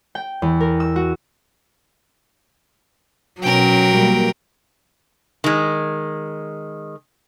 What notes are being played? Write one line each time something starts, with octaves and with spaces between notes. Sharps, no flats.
G5
E2
A#4
E6
F#4
B2 F#3 C#4 A#4 G5
B2 G3 A#3
D#3 G#3